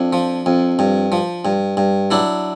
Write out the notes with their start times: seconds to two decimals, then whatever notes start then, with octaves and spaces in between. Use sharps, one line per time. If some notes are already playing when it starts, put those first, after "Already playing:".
Already playing: F2 D4
0.13 F3
0.46 F2
0.79 G2
1.12 F3
1.45 G2
1.77 G2
2.11 F#3 D4 E4